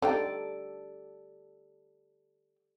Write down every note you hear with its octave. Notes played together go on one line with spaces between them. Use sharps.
D3 D#4 G4 A4 D5 G5